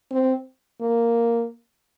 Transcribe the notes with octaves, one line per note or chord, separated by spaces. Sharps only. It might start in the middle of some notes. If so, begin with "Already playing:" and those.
C4
A#3